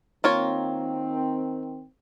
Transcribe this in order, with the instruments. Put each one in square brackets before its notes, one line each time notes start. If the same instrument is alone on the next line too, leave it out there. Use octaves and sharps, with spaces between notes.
[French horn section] D#3 C4 [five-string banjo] A#3 F4 C#5